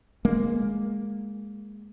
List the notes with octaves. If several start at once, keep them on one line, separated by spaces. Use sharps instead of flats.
G#3 A#3